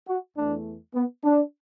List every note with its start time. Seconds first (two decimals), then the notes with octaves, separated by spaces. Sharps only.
0.08 F#4
0.37 E2 E3 A3 D4
0.94 B3
1.24 D4